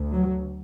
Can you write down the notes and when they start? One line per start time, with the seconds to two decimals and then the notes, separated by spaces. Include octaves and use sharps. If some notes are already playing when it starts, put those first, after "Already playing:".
Already playing: D2
0.13 F#3